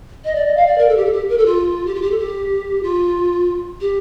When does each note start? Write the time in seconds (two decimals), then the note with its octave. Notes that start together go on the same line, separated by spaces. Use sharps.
0.24 D#5
0.35 D5
0.46 D#5
0.56 F5
0.67 D5
0.78 A#4
0.89 A4
0.97 G4
1.06 A4
1.13 G4
1.29 A#4
1.38 A4
1.46 F4
1.86 G4
1.95 F4
2.02 G4
2.11 A4
2.18 G4
2.83 F4
3.81 G4